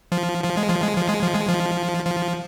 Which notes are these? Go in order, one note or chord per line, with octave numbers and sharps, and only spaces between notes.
F3
F3
G#3
F3
G#3
F3
G#3
F3
G#3
F3
F3